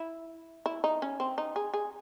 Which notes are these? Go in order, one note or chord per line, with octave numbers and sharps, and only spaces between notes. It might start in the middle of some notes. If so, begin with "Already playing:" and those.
Already playing: E4
E4
D#4
C#4
C4
D#4
G#4
G#4